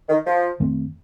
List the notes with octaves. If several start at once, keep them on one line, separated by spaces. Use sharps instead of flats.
D#3
F3
F2 D#3 A3 C4